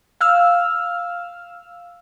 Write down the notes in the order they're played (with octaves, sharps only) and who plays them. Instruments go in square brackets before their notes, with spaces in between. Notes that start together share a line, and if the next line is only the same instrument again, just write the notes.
[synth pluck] F5 E6 F6